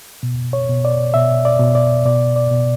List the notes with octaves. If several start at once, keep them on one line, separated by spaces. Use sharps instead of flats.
B2
C#5
B2
D5
B2 E5
D5
B2
D5
B2 D5
D5
B2